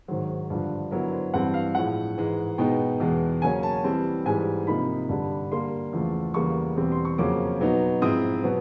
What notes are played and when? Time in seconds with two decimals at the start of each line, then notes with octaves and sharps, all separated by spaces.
0.08 G#2 D#3 F#3 C5
0.50 G2 D3 F3
0.91 D3 F#3 B3 E4 A#4
1.13 C5
1.34 G2 E3 G3 C4 F#5
1.54 F5
1.75 A2 F3 G#3 F#5
2.18 G#2 E3 G#3
2.58 B2 G#3 B3 D#4 G5
3.00 E2 B2 G#3
3.42 C#3 F#3 A#3 C#4 G#5
3.63 A5
3.84 E3 G3 C4
4.25 G#2 E3 G3 G#5
4.67 C3 F3 A#3 D#4 B5
5.09 G2 D3 G3
5.51 D3 G3 A#3 C6
5.93 E2 C#3 F3 A3
6.34 E2 C#3 E3 G3 A#3 C#6
6.76 E2 B2 G3 C4
6.92 C6
7.05 C#6
7.18 F2 C#3 F#3 A#3 C#4 D6
7.61 B2 F#3 B3 D#4
8.02 G#2 F3 G#3 C4 E4 D#6
8.44 B2 F#3 B3